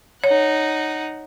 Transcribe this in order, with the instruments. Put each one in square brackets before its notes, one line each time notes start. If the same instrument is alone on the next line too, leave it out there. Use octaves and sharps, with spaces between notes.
[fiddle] D#4 F#5 [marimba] C#5